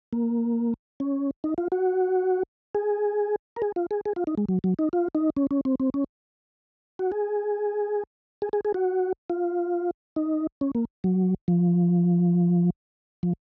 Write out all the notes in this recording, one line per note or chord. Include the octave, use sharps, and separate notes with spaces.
A#3
C#4
D#4
F4
F#4
G#4
A#4
G#4
F4
G#4
G#4
F4
D#4
G#3
F#3
F#3
D#4
F4
D#4
C#4
C#4
C4
C4
C#4
F#4
G#4
G#4
G#4
G#4
F#4
F4
D#4
C#4
A#3
F#3
F3
F3